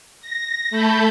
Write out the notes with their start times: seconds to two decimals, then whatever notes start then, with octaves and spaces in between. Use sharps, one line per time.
0.21 A#6
0.70 A3 A5 B5 G6